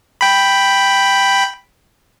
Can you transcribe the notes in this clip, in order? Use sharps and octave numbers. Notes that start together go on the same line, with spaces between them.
G5 B5